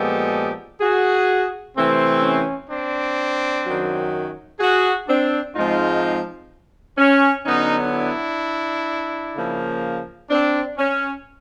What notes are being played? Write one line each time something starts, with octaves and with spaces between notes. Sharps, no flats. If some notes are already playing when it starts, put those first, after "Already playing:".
Already playing: A#2 F3 G#3 B3 G4 A4
F#4 G#4
C3 E3 A3 C4
C#4
C4 D4
F#2 D#3 F#3
F#4 G#4
C4 D4
G#2 F3 G#3 C4 D#4 F4
C#4
D3 F#3 B3 C#4 D#4
D4 E4
C#3 F3 A#3
C4 D4
C#4